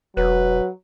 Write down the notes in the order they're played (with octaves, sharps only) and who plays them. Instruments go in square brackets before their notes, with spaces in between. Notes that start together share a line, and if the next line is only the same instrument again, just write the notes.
[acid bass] E1 [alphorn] F#3 [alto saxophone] B4